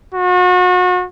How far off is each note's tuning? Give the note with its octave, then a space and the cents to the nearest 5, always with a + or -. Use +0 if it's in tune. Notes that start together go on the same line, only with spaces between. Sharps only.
F#4 -35